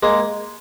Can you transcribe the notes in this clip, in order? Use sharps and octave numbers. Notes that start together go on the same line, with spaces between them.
G#3 A#3